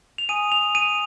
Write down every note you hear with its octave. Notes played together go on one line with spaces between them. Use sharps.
F7
G#5 D#6 D#7
F7
D#7